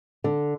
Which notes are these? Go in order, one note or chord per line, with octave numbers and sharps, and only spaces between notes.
D3